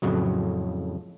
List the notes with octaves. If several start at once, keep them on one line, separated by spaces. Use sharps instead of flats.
F2 A2 C#3 F#3